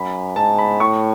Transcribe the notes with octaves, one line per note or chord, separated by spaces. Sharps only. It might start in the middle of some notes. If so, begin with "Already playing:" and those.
Already playing: F#2 B5
G#2 A5
B5
A2 C#6